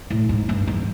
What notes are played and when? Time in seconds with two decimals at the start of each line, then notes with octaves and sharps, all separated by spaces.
0.10 A2
0.29 G#2
0.49 G2
0.67 E2